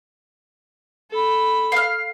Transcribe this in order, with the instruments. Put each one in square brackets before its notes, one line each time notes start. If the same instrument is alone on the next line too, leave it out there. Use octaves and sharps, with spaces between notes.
[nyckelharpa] A4 B5
[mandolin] F5 F6